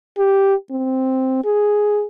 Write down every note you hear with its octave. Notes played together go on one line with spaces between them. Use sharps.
G4
C4
G#4